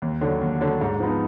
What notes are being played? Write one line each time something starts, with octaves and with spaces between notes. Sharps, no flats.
D#2
D3 F#3 D4
D#2
D3 F#3 D4
G#2
F3 B3 D#4